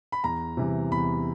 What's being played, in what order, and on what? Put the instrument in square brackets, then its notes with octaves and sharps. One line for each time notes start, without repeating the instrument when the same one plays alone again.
[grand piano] B5
E2 A#5
C3 E3 G3
E2 B5